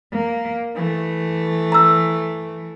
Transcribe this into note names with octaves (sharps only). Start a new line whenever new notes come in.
A#3
E3 A3
A#5 E6